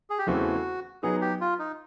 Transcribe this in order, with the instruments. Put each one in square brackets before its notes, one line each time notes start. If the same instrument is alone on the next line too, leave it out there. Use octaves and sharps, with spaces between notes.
[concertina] G#4
G4
[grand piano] E2 C#3 E3 A3 C4 [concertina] F#4
[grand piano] F#3 B3 D#4 [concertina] G#4
[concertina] G4
F4
D#4